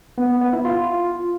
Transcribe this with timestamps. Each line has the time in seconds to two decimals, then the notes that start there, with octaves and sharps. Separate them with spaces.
0.18 B3
0.29 B3
0.41 B3
0.53 E4
0.65 F4